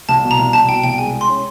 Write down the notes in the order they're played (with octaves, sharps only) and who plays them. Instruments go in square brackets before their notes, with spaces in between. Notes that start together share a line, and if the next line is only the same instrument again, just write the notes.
[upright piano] C2 [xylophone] A5
[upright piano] B2
[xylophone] A#5
[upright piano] C2
[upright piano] B2 [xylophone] A5
[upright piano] B2 [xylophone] G5
[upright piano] C2 [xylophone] G5
[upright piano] G#3 [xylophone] G#5
[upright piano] G#3
[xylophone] C6
[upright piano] C#4